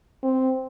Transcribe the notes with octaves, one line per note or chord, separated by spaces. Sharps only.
C4